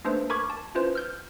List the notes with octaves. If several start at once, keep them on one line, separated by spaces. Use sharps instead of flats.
A3 A#3 D4 B4 C5
A#4 B5 C#6 D6 G#6
A5
C#4 E4 F4 B4 C5
F6 G6